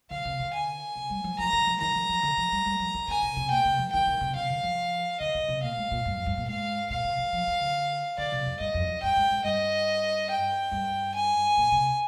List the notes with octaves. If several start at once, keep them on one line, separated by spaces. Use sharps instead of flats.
D3 F5
C3
D3
G#5
C3
G3
F3
F3 A#5
D3
F3
D#3 A#5
F3
F3
D3
F3
G3
G3
F3
D#3
D3 G#5
C3
C3
A#2 G5
C3
F3
D#3 G5
D#3
C3
C3 F5
D3
F3
D3 D#5
D3
C3
A#2 F5
G#2
A#2
G2
F2
G2
A#2
G#2 F5
A#2 F5
C3
D#3
F3
D#3
D3
D3 D5
C3
F2
G2 D#5
F2
F2
G2 G5
G#2
G#2
G2 D#5
G5
G2
G#5
A#2
C3